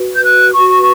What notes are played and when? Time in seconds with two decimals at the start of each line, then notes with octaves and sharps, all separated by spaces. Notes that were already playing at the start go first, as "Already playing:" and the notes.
Already playing: F#4 B4
0.15 G6
0.24 F#6
0.53 F#4 B4 C#6